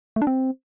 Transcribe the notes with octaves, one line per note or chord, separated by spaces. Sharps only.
A3
D4
C4